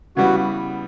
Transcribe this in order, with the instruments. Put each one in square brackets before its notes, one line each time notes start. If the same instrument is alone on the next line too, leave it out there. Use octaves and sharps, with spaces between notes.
[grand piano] C#3 E3 G3 B3 [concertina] F#4